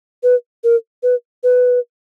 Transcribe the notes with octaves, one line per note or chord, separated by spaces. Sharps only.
B4
A#4
B4
B4